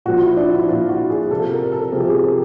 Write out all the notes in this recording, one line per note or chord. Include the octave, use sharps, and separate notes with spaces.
A#2 F3 F#4
E4
D4
E4
A#2 F3 F4
F#4
G#4
G#4
C3 F3 A4
A#4
A4
C3 F3 G4 G#4
G#4